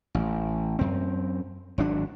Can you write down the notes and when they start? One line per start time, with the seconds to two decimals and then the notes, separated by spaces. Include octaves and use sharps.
0.15 A1
0.79 F#2 C4
1.78 G#1 F#3 D4